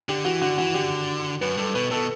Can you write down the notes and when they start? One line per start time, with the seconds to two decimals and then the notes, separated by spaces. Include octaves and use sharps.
0.09 D3 G4
0.24 E3 F#4
0.41 D3 F#4
0.58 E3 F#4
0.74 D3 G4
1.41 F#2 B4
1.57 G2 A4
1.74 B2 B4
1.91 B2 A4